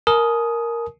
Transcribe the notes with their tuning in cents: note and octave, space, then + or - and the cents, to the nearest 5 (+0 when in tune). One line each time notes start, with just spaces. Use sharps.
A#4 +0 G#5 +40 D#6 +5